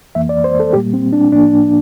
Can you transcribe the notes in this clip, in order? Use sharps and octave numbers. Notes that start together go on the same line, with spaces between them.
F2 E3 A#3 E5
D5
C5
A4
A#2 G3 A#3 G4
C4
D4
A2 F3 A#3 D4